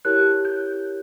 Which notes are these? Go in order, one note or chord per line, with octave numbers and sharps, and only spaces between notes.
E4 G4 A#4 C#5 F#6
G6